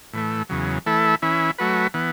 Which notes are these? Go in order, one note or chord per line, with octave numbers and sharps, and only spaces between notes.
A2 E3 A3
E2 C#3 F#3
E3 A3 E4 A4
E3 C#4 E4
F#3 A3 F#4 B4
E3 B3